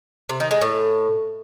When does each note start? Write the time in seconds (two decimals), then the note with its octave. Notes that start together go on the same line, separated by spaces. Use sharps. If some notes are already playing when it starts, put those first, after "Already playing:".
0.29 C3
0.40 D#3
0.51 G#3
0.61 A2